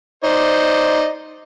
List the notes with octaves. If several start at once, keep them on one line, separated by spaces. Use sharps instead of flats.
D#4 C5 D5